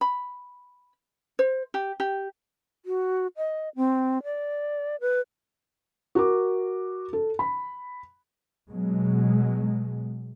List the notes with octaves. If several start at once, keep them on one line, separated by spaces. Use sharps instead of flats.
B5
C5
G4
G4
F#4
D#5
C4
D5
B4
F#4 A#4 D6
A4
B5
B2 F#3 G#3